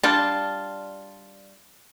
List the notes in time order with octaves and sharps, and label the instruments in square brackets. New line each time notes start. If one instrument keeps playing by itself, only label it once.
[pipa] G3 D4 F4 [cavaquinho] A5